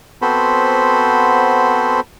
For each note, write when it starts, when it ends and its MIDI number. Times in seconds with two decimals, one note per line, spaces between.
0.22 2.00 59
0.22 2.00 60
0.22 2.00 66
0.22 2.00 69
0.22 2.00 72
0.22 2.00 83